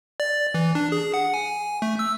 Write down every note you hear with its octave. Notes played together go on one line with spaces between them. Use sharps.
D5
E3
D4
G#4
F#5
G#5
A3
E6